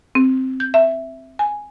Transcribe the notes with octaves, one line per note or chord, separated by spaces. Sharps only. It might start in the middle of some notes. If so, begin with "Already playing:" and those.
C4
G6
E5
G#5